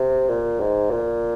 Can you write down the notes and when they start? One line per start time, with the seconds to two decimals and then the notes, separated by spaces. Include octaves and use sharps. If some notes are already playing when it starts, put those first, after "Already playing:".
Already playing: C3
0.29 A#2
0.61 G#2
0.91 A#2